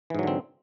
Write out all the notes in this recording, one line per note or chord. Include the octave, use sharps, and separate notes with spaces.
G#2 D3 E3 F#3 C4